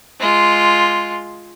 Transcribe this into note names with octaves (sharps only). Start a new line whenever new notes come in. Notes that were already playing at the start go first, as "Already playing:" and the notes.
G#3 F4